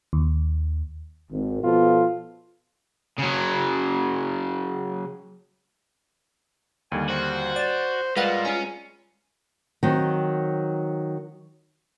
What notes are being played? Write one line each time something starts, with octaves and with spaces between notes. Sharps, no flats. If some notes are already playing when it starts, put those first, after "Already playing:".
D#2
G#1
B2 F3 B3 F4 A4
C#3 F#3
D#2 D3 G3 G#5
F#4 C5
D5 A6 E7
A#2 G3 G#3 B4 F5 F#5
C#4 F4 A#5
D#3 F#3 C4